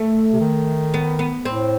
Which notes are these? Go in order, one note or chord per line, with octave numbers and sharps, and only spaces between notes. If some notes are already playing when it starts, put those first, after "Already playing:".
Already playing: A3
C3
D#3
B3
B3
A2 C4